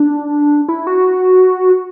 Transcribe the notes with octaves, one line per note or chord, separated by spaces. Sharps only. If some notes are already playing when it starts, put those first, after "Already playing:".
Already playing: D4
E4
F#4